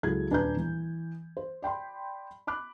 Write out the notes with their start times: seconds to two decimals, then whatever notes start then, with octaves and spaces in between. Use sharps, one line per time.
0.03 C#2 F#3 E4 G#4 A4 G#6
0.30 D#1 D4 B4 G#5 A#5 G6
0.57 E3
1.37 C5
1.62 D5 G5 B5 C6
2.47 B5 D6 F#6